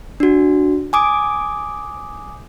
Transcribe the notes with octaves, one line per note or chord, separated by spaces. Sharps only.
D4 F#4
G#5 D6 D#6